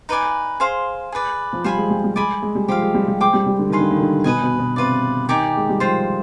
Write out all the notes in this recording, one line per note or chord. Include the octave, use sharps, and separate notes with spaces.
D#4 B4 D5 G#5
G#4 C5 F5 C6
G#4 B4 D5
F3
G3 C5 F5 G#5 B5
G#3
G3
G3
G#3 D5 G#5 B5
G#3
G3
F3 G4 C5 F5
G#3
G3
G3
G#3 C5 G5 D6
G3
G3
D3
D#3 G#4 B4 F5 C6
D3
D#3
D3
B2 B4 D#5 G#5
B2
B2
C3 F4 B4 D5
D#3 D#4 G4 D5 G#5
G#3
G3
F3 F4 C5 G5